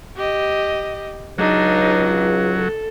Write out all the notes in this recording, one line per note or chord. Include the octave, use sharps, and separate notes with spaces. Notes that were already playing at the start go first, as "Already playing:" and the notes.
G4 D#5
C#2 F#3 D4 D#4
A4